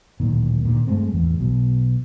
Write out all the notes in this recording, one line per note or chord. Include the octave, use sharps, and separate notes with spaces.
D1 A#2 D#3
A#2 D3 D#3
G2 G#3 A3 C4
A1 E2
B1 B2